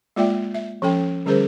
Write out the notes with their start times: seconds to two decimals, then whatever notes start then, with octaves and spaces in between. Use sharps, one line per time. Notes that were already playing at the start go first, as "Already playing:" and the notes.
0.16 G#3 A#3 F4 D5 E5 G5
0.54 E5
0.82 F3 C#4 A4 G5
1.26 D3 G3 C#4 G#4 A#4 C5